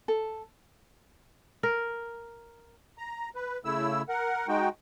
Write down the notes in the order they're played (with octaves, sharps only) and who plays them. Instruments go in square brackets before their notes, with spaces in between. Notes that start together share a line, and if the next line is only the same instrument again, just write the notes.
[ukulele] A4
[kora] A#4
[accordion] A#5
B4
C#3 A3 E4 E6
A#4 F#5
G#3 D#4 F#4 G5